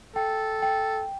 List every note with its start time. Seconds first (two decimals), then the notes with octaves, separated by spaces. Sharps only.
0.16 A4 G5
0.62 G5